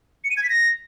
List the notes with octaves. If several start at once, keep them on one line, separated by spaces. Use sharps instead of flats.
C#7
D#7
G#6
B6
A#6